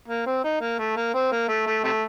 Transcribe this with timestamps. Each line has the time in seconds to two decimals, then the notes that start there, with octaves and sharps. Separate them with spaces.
0.08 A#3
0.26 C4
0.44 D#4
0.61 A#3
0.79 A3
0.97 A#3
1.15 C4
1.32 A#3
1.49 A3
1.67 A3
1.84 C3 A3